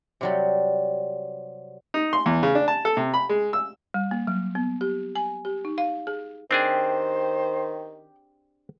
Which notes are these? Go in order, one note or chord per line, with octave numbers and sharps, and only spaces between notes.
C3 F#3 G3
D#4
C6
E2
C#3
D4
A5
A4
C3
B5
G#3
E6
G3
A#3
F#3
B3
G4
G#5
G4
D#4
F5
G#4
D#3 C4 D4 G4 G#4 C5